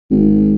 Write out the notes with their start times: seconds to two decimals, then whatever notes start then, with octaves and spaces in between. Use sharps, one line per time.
0.11 G#1